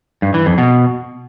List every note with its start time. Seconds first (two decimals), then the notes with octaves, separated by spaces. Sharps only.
0.22 G2
0.34 E3
0.46 F2
0.58 B2